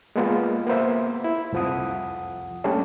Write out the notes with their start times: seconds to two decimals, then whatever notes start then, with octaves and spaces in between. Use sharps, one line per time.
0.16 G#3 A#3 B3 F4
0.67 A#3 B3 C5 E5
1.24 E4
1.52 C2 F2 F3 F#5 D#6
2.64 G3 A3 A#3 C#4 D4